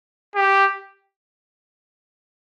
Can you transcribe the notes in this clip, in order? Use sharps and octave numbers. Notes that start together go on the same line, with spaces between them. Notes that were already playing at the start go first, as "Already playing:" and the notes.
G4